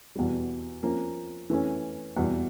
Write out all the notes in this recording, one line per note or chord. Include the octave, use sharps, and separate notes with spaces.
E2 B2 G3
F3 A#3 C#4
E3 A3 C#4
E2 B2 G3